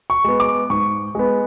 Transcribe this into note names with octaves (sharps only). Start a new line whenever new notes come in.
C#6
G#3 B3
D6
G#2 C#6
G#3 B3